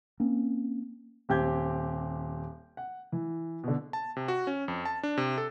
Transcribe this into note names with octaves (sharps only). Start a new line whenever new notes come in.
A#3 C4 C#4
D#1 C4 G4 G6 G#6
F#5
E3
B2 D3
A5
C3
F#4
C#4
F2
A5
D4
C3
A4